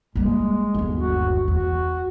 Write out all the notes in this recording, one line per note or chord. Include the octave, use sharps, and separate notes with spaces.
G3 G#3 A#3
G1 D#2
F#4
E2 F#4